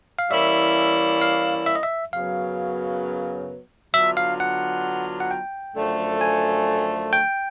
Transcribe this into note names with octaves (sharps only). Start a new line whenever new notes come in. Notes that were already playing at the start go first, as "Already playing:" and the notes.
F5
E3 G3 A#3 C#4 E4 E5
F5
E5
D#5
E5
F#2 C#3 F#3 B3 F5
D3 F#3 B3 D4 F4 E5
F5
F#5
F#5
G5
F#2 D3 F3 A3
G#5
G5